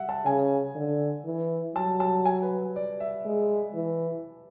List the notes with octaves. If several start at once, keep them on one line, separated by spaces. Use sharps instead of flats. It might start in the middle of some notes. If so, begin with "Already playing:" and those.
Already playing: E5 F#5
A5
C#3 G#5
D3
E3
F#3 A5
A5
G#5
B4
D5
E5
G#3
E3